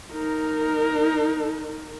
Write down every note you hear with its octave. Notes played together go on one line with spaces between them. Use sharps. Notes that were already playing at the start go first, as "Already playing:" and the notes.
D#4 A#4